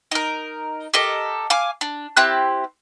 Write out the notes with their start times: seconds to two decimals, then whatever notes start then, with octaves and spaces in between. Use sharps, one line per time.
0.11 D#4 A#4
0.94 G4 A4 A#4 D#5
1.50 F5 G#5 D6
1.81 D4
2.17 C4 E4 G4 F#6